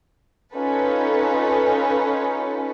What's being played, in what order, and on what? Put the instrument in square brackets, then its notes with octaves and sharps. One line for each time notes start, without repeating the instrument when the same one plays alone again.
[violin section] C#4 D#4 F4 A4 B4